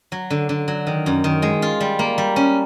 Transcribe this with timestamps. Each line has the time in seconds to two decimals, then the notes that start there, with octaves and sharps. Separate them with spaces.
0.12 F#3
0.30 D3
0.49 D3
0.68 F#3
0.87 D#3
1.06 F#2
1.24 D#3
1.42 G#3
1.62 F4
1.80 G3
1.99 A#3
2.18 G3
2.36 C#4